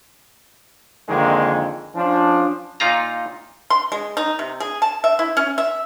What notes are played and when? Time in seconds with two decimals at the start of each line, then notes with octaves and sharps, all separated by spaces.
1.09 F2 D3 D#3 G#3 A#3
1.95 F3 C#4 D4
2.80 A#2 D#4 F4 A#5
3.70 C6
3.92 G#3
4.17 D#4
4.39 C3
4.60 G#4
4.82 A5
5.04 E5
5.19 E4
5.37 C#4
5.58 E5